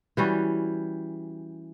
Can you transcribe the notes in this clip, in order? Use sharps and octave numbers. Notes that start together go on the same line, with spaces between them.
E3 G3 C#4 F#4